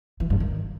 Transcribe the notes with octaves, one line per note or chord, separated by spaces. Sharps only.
E3
G2
D#3